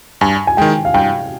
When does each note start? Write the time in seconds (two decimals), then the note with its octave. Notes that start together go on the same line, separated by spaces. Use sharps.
0.21 G2 G#5
0.47 G#5
0.57 D#3 G#3 G5
0.85 F5
0.94 G2 G5